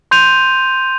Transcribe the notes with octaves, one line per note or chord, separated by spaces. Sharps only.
C6 G6 D#7 F7